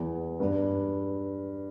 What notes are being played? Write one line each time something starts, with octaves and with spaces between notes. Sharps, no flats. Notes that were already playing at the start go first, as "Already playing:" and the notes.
Already playing: E2
G2